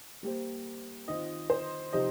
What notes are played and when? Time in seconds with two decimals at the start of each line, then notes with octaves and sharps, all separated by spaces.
0.23 G3 A#3 G4 C5
1.08 D#3 C4 F4 C5 D#5
1.50 C5
1.93 C3 F3 D#4 G4 C5 D#5